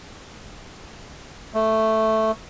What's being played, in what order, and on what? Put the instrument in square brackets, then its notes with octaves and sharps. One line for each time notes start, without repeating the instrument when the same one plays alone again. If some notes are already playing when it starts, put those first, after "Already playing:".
[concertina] A3